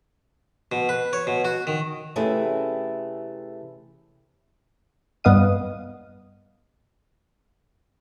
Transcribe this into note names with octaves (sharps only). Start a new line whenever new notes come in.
B2
B4
C#5
B2
F#4
D#3
C3 E3 A3 C#4 G4 G#4
G2 B3 D#5 F5 D#7